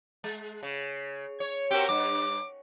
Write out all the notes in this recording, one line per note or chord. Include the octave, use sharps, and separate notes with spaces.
G#3
C#3
C#5
C4 F#4 G4 A#4
G2 D6